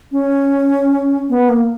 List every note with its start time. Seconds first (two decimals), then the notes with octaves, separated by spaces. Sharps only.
0.12 C#4
1.29 B3
1.49 A#3